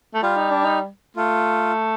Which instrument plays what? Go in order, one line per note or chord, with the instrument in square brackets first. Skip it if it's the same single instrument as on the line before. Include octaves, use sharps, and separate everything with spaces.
[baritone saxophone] A3
[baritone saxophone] G3 [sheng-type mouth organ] F4
[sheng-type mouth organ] D#4
D4
D#4
[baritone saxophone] A3 [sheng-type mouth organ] F4